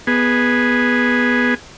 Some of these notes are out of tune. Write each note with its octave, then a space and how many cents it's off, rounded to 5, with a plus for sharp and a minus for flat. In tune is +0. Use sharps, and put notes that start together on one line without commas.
B3 -5 G#4 +0